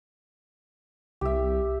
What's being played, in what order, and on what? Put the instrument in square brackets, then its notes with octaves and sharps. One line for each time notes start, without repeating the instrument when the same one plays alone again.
[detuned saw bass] C2 [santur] G4 E5